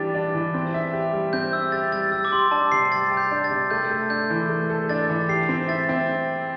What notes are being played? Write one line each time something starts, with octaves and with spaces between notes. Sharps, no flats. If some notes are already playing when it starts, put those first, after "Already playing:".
Already playing: E3 G3 D4 G4 A6
D4
E3
C4
E5
G4
G3
C4 G6
E5 E6
G4 A6
G3 A6
G3 E6
D6
G4 C6
D4 A5
C3 C7
G3 A6
G4
G6
D4
A6
C3
A3 G6
A4
D4 G6
E3
A3
A4
D4 A6
E3
G4 C7
C4
E5 A6
C4